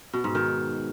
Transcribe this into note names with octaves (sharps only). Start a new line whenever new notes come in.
B2
G#2
D#3